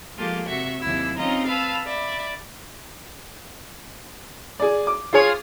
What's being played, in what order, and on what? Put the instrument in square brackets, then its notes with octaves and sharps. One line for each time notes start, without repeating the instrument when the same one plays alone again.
[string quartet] F3 G#3 A#3 F4 G4 A4
C3 F#4 E5 C#6
D#2 C3 F#3 E4 E6
C4 C#4 D#4 F4 D#5 A#5
B4 F5 A5 B5 E6
D5 E5 B5
[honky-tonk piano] G#4 D5
D6
[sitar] F4 G#4 C#5